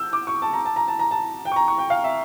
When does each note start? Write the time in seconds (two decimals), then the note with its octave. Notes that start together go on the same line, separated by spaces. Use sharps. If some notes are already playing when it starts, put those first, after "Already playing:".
Already playing: E6 G6
0.13 D6
0.27 C#6
0.42 A5
0.53 A#5
0.65 A5
0.76 A#5
0.88 A5
0.99 A#5
1.11 A5
1.45 G5
1.52 C#6
1.56 A#5
1.68 C#6
1.78 G5
1.90 F5
2.04 E5